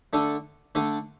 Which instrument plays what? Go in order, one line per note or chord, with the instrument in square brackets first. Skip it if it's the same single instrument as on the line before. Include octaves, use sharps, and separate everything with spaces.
[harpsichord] D3 A3 D4 A4
D3 A3 D4 A4